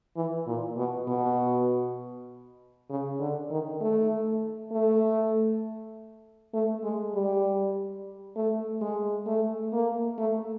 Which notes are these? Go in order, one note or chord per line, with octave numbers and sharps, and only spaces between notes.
E3
A#2
B2
B2
C#3
D3
D#3
A3
A3
A3
G#3
G3
A3
G#3
A3
A#3
A3